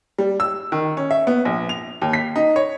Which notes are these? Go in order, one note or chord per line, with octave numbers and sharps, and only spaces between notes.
G3
E6
D#3
C#4
E5
B3
A#1
F7
D#2
B6
D#4
C#5